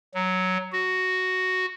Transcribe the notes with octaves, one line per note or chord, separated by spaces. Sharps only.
F#3
F#4